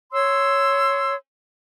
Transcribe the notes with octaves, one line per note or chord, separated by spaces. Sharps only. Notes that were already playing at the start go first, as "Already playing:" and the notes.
C#5 C6 E6